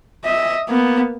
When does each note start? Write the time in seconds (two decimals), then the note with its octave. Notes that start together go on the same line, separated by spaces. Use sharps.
0.25 D#5 E5
0.68 A#3 B3